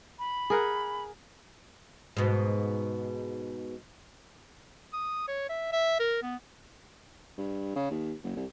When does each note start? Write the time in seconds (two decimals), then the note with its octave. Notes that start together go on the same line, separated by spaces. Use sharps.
0.19 B5
0.50 G#4 A#4 F#5
2.17 G#2 B2
4.93 D#6
5.28 C#5
5.49 E5
5.73 E5
6.00 A#4
6.23 B3
7.37 G2
7.76 C#3
7.90 D#2
8.23 F#1
8.36 C2